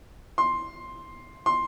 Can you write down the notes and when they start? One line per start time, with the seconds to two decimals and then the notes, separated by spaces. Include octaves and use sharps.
0.38 C6
1.46 C6